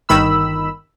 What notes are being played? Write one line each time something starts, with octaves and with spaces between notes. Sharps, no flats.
G1 D#3 B5 E6